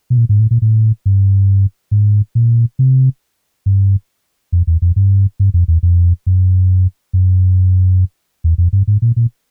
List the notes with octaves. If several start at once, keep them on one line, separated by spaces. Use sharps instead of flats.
B2
A#2
G#2
A2
A#2
A2
G2
G#2
A#2
C3
G2
F2
E2
F2
G2
G2
F2
E2
F2
F#2
F#2
E2
F2
G2
G#2
A#2
A#2